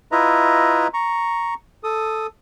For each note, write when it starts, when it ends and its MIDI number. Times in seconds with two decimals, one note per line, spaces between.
0.12 0.87 64
0.12 0.87 65
0.12 0.87 71
0.12 0.87 75
0.12 0.87 76
0.12 0.87 82
0.94 1.54 82
0.94 1.54 85
1.84 2.27 69
1.84 2.27 87